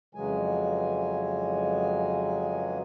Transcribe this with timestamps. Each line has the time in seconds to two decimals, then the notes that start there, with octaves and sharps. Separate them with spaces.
0.15 F2 C#3 E3 F#3 G#3 G#5